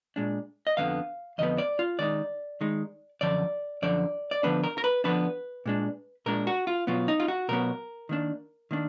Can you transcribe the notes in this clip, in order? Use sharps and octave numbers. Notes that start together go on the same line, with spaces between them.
A#2 G#3 D4
D#5
F2 D3 F3 B3 F5
F2 D3 F3 B3 D#5
D5
F4
D#3 G#3 D#4 D5
D#3 G#3 D#4
F#2 D3 F3 D5
F#2 D3 F3 D5
D5
D3 F3 B3 D4 B4
A#4
A#4
B4
D3 F3 B3 D4 B4
A#2 G#3 D4
A#2 G#3 D4 A#4
F#4
F4
B2 F#3 B3 F4
D#4
F4
F#4
B2 F#3 B3 A#4
D#3 A#3 D4
D#3 A#3 D4